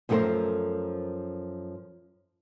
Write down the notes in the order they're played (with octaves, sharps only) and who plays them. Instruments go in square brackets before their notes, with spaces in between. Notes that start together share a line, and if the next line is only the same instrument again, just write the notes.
[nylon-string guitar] F#2 F3 A3 F#4 A#4 C5